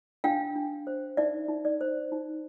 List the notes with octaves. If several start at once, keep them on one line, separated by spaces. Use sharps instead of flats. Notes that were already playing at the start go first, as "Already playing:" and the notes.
D4 F5 G5
D4
C5
D#4 D5 E5
D#4
D5
C5
D#4